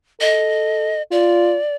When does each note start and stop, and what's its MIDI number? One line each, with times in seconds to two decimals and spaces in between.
0.21 0.98 69
0.21 1.02 75
1.12 1.58 65
1.12 1.76 74